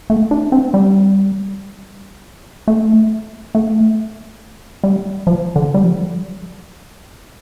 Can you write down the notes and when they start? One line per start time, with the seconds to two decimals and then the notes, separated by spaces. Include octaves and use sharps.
0.10 A3
0.31 D4
0.52 C4
0.74 G3
2.68 A3
3.55 A3
4.84 G3
5.27 F3
5.56 D3
5.74 G3
5.84 F3